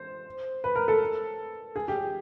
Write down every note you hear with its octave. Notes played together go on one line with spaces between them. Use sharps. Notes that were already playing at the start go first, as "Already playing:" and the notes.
Already playing: C5
B4
A#4
A4
G#4
G4